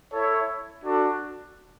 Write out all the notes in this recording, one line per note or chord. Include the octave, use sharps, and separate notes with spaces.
E4 A4 C#5
D4 F#4 A4